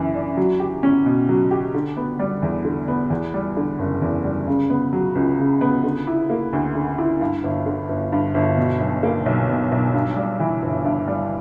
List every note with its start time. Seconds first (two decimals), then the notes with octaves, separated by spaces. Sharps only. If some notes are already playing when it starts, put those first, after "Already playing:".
Already playing: F#2 E3
0.14 D4
0.37 F#3
0.60 G4
0.83 C#4
1.06 B2
1.29 F#3
1.51 G4
1.74 D3
1.97 B3
2.19 G3
2.42 E2
2.64 D3
2.88 B3
3.10 E2
3.34 G3
3.57 D3
3.79 F#1
4.02 E2
4.25 G3
4.47 C#3
4.70 B3
4.93 F#3
5.15 C#2
5.39 C#3
5.61 B3
5.83 D3
6.07 E4
6.30 A#3
6.53 D2
6.75 D3
6.98 E4
7.21 G2
7.44 G1
7.66 D3
7.89 G1
8.12 G2
8.34 G1
8.57 B2
8.80 B1
9.03 A#3
9.26 B1
9.49 B2
9.72 B1
9.94 G2
10.16 G3
10.40 E3
10.62 G1
10.85 G2
11.07 G3